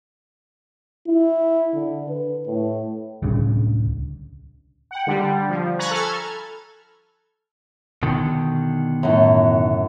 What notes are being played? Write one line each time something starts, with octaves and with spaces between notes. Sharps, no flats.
E4
D3
B4
A2
D1 C2 C#3 D4
F#5 G5
D3 G3
F3
G#5 A#5 B5 C#6 F#6 A6
A4 F6 G#6
B2 D3 D#3
F#2 A2